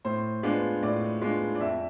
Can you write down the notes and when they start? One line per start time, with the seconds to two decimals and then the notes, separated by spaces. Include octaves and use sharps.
0.05 A2 C5
0.43 G#3 B3 D4 F4
0.82 A2 D5
1.22 G#3 B3 D4 F4
1.55 D5
1.60 F2 E5